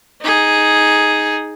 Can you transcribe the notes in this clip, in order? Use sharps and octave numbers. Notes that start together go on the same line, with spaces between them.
D#4 G#4